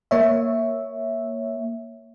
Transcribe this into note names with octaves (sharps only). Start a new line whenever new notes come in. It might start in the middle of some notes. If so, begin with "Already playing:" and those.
A#3 C#5 E5